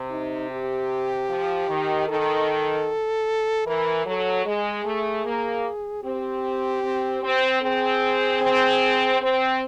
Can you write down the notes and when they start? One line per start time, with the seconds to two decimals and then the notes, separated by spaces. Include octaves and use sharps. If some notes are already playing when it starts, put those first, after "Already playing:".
Already playing: C3
0.10 D#4
0.50 G4
1.29 F3
1.68 D#3
2.08 D#3 A4
3.67 E3 A#4
4.06 F#3 A4
4.46 G#3 G#4
4.85 A3
5.25 A#3
6.03 C4 G4
6.83 C4
7.23 C4
7.62 C4 G#4
8.42 C4
9.21 C4